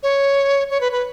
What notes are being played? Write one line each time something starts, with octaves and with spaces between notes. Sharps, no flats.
C#5
C#5
B4
B4